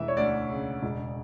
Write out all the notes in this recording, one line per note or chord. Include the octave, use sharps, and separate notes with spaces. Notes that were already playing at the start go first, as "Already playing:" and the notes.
Already playing: E1 E3 E5
C#5
D2 D5
C#3
E1